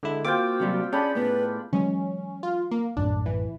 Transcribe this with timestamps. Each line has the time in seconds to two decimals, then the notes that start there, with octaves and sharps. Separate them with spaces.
0.03 D3 G#3 E4
0.25 A#3 C4 F4 F#4 G5 D6
0.60 C3 F#3 G3
0.93 C#4 D4 G#4 D5 G5 B5
1.15 A2 B3 B4
1.73 E3 F#3 G#3 C#4
2.43 F4
2.71 A#3
2.97 A#1 F#2 A2 D4
3.26 E3